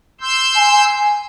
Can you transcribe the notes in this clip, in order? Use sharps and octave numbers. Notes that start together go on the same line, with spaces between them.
C6 E6 G6
G#5